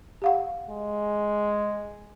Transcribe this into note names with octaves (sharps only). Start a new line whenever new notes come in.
G4 F5 F#5
G#3